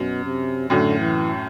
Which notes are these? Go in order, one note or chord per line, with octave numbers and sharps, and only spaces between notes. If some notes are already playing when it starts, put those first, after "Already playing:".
Already playing: F#2 B2
C3
F#2 A2 D3
E3